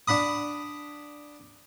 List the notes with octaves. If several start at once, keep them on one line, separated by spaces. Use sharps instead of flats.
D4 F#5 B5 D#6